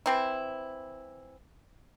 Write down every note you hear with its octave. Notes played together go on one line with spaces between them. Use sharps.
E3 C4 E4